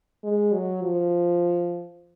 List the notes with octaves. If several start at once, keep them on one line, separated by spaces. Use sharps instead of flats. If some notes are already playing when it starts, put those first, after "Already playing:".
G#3
F#3
F3